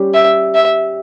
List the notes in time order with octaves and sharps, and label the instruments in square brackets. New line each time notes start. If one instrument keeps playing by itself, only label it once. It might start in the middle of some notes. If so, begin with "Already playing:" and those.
Already playing: [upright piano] G3 C#4 G4
[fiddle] E5
E5